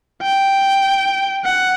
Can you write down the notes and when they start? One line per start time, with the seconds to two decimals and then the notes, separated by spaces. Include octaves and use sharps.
0.22 G5
1.45 F#5